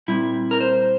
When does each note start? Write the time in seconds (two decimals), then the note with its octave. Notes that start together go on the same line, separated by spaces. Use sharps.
0.08 A#2 G3 C4 E4
0.51 A#4
0.60 C5